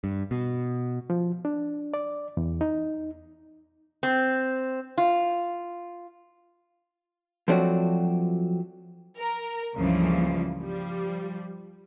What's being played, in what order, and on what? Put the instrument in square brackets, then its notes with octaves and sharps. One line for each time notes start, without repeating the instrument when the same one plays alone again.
[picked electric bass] G2
B2
[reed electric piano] F3
D4
D5
E2
D#4
[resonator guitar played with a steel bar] C4
F4
[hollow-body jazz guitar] F3 F#3 A3 C4 D4 F#4
[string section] A#4
C#2 G2 C#3 E3 F3 A#3
F3 G3